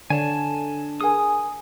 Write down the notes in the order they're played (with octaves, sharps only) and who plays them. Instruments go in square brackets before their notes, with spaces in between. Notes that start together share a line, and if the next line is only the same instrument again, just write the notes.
[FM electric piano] D3 [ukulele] C#5 [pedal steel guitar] G#5 A5
[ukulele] G#4 A#4 G#5 [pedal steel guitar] D#6